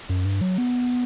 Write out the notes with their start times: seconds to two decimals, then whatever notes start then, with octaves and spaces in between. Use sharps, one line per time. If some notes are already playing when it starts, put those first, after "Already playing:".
0.09 F#2
0.25 G2
0.41 F#3
0.58 B3